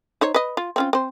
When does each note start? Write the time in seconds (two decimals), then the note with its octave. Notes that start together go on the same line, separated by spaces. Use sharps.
0.21 D#4 C5 C#5
0.34 B4 D#5
0.57 F4
0.76 C4 C#4 F4
0.93 C4 C5